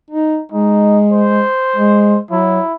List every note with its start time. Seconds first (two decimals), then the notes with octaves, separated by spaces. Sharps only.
0.11 D#4
0.52 G#3 D#4
1.12 C5
1.76 G#3
2.31 F#3 E4